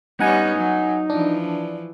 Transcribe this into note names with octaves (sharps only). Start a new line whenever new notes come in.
G3 B3 C#4 D#4 F#5 G#5
F#3
E3 F3 D4